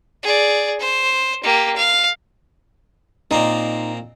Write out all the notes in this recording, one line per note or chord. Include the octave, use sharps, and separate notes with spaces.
G#4 D5
C5
A#3 G4
F5
A#2 A#3 C4 D#4